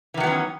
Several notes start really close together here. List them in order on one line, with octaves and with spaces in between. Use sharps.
E3 D#3 F#3 B3 C#4